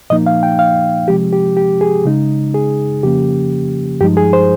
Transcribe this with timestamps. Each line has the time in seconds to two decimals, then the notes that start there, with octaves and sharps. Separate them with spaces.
0.10 A#2 F3 A#3 D#4 D#5
0.26 F5
0.43 G5
0.59 F5
1.08 C3 F3 G#3 C4 G4
1.33 G4
1.57 G4
1.81 G#4
2.05 C#3 G#3 D#4
2.54 G#4
3.03 F2 C#3 F3 A#3 C#4 G4
4.01 G2 F3 G#3 D#4 G4
4.17 G#4
4.33 C5